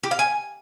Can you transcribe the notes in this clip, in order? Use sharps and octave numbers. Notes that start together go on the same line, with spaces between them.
G4
F5
G#5